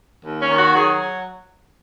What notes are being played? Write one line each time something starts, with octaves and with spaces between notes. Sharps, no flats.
D#2
C#4
D#3
F#4
F#3 G#4